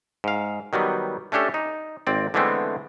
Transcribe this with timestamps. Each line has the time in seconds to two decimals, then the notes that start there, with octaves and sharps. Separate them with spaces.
0.24 G#2 F5
0.73 D#3 F#3 G3 B3
1.32 A3 C#4 D4 G4 A4
1.54 D#4
2.07 G#1 C4 D5
2.34 D3 E3 G#3 A3 B3 C4